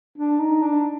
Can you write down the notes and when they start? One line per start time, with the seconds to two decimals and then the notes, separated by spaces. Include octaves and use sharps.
0.18 D4
0.40 D#4
0.63 D4